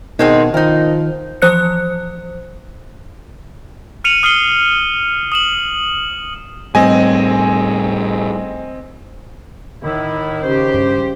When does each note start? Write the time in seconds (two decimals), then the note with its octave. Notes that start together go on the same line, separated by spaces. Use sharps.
0.19 B2 D#3 G#3 C4 D#4
0.54 D#3 F3 D#4 A#4
1.42 E3 F3 C5 F#6 C#7
4.04 F6 C#7 D#7 F7 F#7
4.23 D#6 F6 C7 C#7 G7
5.32 D#6 E7 F#7
6.75 A2 G3 C4 D#5 G#5
9.83 A2 D#3 E4
10.43 C#3 G4 C5
10.74 G2